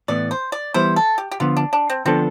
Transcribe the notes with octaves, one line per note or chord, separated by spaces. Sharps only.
A2 E3 B3 D5
C5
D5
E3 G3 B3 E4 C5
A4
G4
G4
D3 F3 B3 F4
D4
D4
C4
D3 F3 B3 C4 D4 A4